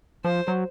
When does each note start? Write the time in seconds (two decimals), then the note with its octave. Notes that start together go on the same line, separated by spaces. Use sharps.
0.24 F3 C5
0.48 F#3